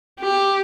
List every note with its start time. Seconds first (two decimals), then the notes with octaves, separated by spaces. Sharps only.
0.20 G4